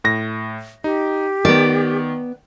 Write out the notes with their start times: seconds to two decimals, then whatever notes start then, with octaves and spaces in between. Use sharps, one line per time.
0.04 A2 A#6
0.84 D#4 G4
1.45 D#3 B3 D5